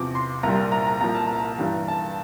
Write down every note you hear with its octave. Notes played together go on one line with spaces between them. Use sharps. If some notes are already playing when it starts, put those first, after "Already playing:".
Already playing: E2 C3 F3 D6
C6
C2 A#2 G3 A#5
A#5
A#5
C2 A#2 F3 A#5
A5
A#5
G2 E3 G3
A5